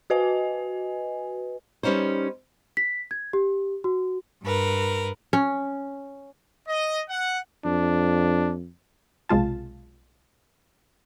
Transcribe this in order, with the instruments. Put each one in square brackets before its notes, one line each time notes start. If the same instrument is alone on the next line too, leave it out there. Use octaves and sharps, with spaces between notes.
[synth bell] F#4 B4 D#5 G#5
[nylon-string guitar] G3 B3 C#4 D#4 C5
[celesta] B6
G#6
G4
F#4
[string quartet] G2 A#4 B4
[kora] C#4
[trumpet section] D#5
F#5
[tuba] F2 [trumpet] D4
[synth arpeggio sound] B1 C3 G#3 F4 A5